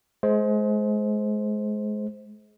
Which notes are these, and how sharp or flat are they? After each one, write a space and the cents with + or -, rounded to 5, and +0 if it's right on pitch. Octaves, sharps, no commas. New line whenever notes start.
G#3 +30 C5 +0